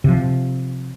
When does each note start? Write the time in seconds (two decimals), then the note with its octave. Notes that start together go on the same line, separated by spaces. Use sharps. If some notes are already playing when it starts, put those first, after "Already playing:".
0.04 C3 F3